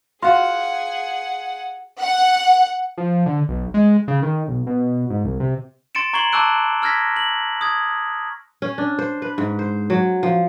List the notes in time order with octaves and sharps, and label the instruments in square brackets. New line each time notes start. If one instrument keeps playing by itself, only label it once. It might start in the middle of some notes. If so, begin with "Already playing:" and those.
[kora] F4 F#4 [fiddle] G#4 F#5 [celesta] F5 C6
[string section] F#5
[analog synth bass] F3
D3
B1
G#3
C#3
D#3
B1
B2
G#2
C2
C3
[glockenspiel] C6 A6 C#7 D7 E7
A#5 C#6 G#6 C7 F#7 G7
A5 C#6 D6 E6 F#6 D7
E6 F6 G#6 A#6 B6
F#7
D#6 G#6
[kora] C#4
D4
C5
B4
G#2
C5
F#3
F3